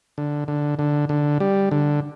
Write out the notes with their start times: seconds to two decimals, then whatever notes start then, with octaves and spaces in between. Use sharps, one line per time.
0.18 D3
0.48 D3
0.79 D3
1.09 D3
1.40 G3
1.71 D3